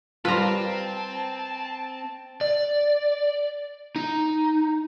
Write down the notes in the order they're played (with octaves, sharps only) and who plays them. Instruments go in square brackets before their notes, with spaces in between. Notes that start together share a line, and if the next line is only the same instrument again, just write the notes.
[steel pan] G3 F4 [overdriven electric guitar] C4 [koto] B4 A#5 [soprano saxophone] A5
[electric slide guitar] D5
D#4